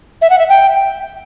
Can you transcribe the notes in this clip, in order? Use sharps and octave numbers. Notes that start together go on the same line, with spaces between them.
E5
F#5
E5
G5